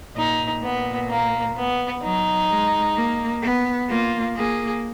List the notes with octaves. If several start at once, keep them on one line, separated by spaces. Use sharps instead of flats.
A#2 D#4
A#2 B3
A#3
B3
F#3 D#4
G#3
A#3
B3
A#3 F4
A#3 G#4